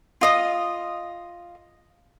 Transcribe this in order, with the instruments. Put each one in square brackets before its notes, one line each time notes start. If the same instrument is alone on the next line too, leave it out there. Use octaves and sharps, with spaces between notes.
[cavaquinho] F4 D#5 D#6